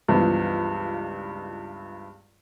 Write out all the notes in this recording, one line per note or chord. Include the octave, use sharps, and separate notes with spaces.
C#2 G2 E3 F3 B3